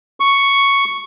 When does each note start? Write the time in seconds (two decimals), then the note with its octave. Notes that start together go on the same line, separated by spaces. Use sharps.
0.20 C#6